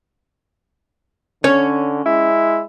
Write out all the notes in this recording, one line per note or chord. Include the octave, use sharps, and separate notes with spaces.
D3 C#4 C#5
G#3 E4